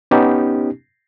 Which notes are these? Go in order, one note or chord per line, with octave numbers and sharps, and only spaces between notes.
B3 C#4 D#4 G4